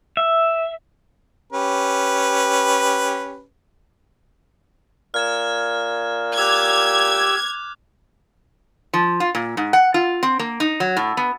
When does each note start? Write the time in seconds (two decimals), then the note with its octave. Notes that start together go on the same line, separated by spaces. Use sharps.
0.17 E5
1.53 C#4 G4 B4
5.14 A#2 F6 G#6 E7
6.38 G4 D6 E6 F#6 G#6
8.93 F3
9.20 F4
9.35 A#2
9.57 G#2
9.73 F#5
9.94 F4
10.23 C4
10.39 A#3
10.60 D#4
10.80 F#3
10.97 A2
11.17 B3